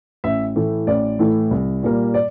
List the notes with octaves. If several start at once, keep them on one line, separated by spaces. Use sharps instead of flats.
A1 E5
A2 E3 A3
A1 D5
A2 E3 A3
C2
A#2 G3 A#3
D5